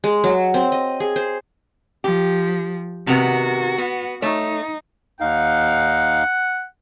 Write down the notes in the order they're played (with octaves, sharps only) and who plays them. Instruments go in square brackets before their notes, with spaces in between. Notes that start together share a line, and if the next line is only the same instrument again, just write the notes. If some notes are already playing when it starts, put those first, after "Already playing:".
[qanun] G#3
F#3
C4
D#5
G#4
C5
[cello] F3 [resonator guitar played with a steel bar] G4
[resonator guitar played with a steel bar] C3 D#3 B3 [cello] F#4
[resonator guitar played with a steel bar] B3
[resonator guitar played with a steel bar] A3 C#5 [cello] D#4
[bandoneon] D#2 D#4 F5 [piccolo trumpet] F#5